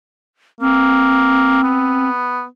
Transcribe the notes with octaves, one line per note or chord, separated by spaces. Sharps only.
A#3 C4
B3